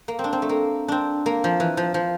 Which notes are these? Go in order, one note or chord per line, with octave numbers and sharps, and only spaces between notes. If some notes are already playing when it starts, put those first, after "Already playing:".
A#3
C4
D4
C4
A3
A#3
C4 D4
A#3
F3
E3
F3
F3